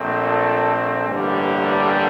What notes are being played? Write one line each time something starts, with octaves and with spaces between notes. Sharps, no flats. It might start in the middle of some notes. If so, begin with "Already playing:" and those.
Already playing: A#1 A#2 A3 C4
A4
A1 G2 D3 G3 A#3